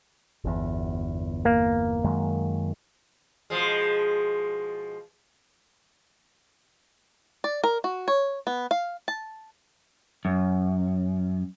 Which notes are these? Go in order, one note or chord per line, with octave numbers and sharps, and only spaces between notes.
G1 E2
A#3
F#2 D#3 G#3
B2 F3 G#3
D5
A#4
F#4
C#5
B3
F5
A5
F#2